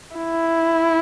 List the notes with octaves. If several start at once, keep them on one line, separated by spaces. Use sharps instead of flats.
E4